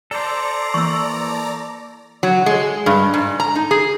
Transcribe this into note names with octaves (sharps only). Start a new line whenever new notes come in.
A4 C5 D5 A#5
E3 A#3 C#6 E6
F#3
G#3
G2
G#2
A#5
D#4
G#4